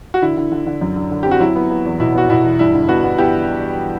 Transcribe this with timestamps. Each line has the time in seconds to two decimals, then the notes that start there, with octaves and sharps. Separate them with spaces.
0.14 F#4
0.22 D3 E4
0.37 D3
0.52 D3
0.66 D3
0.81 F#2
0.96 D3
1.11 D3
1.23 C4 G4
1.31 F#4
1.40 F#3 E4
1.56 B3
1.70 B3
1.85 E2
2.00 B2 E4
2.15 B3 F#4
2.29 B2 E4
2.45 E2
2.59 G2 E4
2.74 D3
2.88 B3 F#4
3.04 B3
3.18 B3 E4 G4